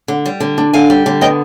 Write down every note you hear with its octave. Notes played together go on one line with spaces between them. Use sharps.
D3
G3
D3
D4
D3 F5 G#5
G3
D3
B3 D#5 G5